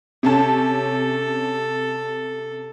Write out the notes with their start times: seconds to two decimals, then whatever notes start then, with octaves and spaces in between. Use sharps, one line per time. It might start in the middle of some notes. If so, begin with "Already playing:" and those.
0.23 C3 C#4 A4 A5